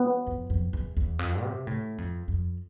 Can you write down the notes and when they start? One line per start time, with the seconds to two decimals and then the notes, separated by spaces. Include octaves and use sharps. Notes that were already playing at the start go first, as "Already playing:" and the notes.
Already playing: B3
0.27 F2
0.50 F2
0.73 E2
0.97 E2
1.19 F2
1.43 C3
1.67 A2
1.98 F2
2.28 F2